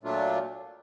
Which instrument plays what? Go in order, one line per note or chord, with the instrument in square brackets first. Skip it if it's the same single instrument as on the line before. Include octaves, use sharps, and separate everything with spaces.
[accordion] A#2 F#3 A3 D4 F4